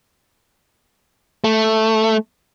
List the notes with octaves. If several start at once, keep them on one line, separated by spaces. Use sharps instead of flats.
A3